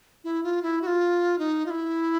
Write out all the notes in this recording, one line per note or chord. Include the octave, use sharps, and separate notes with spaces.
E4
F4
E4
F#4
F4
D#4
F4
E4